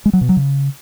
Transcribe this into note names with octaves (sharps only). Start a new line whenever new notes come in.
G#3
F#3
B2
F#3
C#3